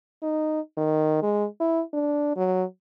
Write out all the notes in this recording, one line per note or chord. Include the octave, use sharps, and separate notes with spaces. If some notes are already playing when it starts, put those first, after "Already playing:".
D#4
D#3
G#3
E4
D4
F#3